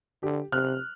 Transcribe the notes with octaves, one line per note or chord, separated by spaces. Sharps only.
D3 G4
C3 F6 F#6